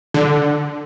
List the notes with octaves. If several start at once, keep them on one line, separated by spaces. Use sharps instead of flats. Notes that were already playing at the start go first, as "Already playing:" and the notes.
D3